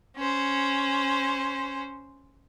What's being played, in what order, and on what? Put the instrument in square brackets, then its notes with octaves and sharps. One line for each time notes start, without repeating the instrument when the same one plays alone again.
[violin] C#4 C5